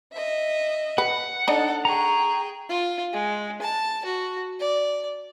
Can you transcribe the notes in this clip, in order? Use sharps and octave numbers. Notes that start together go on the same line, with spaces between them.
D#5 E5
B4 F#5
D4 D#4 A4 C#5
G#4 G5 A#5 C#6
F4
G#3
A5
F#4
D5